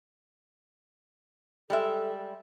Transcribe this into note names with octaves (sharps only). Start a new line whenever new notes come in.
G3 G#3 A4 E5